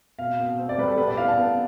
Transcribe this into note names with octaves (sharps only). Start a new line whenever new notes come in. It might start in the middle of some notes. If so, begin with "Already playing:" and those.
B2 F5
B2
C4
D5
G3 B4
A4
B3 B4
D5
E4 F5
A5
B3